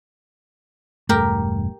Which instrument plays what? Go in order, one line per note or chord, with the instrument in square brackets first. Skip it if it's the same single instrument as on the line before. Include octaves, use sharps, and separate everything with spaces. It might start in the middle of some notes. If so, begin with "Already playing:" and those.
[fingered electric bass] E1 G2 A3 [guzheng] G4 A#4